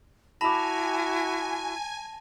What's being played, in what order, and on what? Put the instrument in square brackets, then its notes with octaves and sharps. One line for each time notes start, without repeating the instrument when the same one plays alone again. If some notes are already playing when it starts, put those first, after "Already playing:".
[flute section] E4 F#4 [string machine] G#5 [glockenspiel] A5 A#6 F7 [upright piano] B5 D6